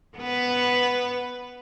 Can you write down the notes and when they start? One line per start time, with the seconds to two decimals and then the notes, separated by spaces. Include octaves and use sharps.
0.18 B3 B4